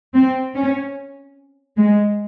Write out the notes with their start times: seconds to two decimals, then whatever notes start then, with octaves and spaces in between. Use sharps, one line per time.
0.15 C4
0.55 C#4
1.77 G#3